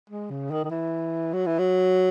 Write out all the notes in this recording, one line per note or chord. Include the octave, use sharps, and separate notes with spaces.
G#3
C#3
D#3
D#3
E3
F#3
E3
F#3